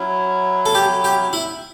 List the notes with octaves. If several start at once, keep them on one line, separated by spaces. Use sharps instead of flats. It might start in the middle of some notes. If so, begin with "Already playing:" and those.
Already playing: F#3 C#4 E4
A4
G4
G4
E4